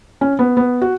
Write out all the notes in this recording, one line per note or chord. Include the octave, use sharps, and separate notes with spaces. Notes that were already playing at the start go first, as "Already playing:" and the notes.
C#4
B3
B3
F#4